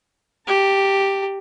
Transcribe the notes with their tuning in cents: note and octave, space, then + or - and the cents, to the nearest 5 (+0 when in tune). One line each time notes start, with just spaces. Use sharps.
G4 +0 A5 +35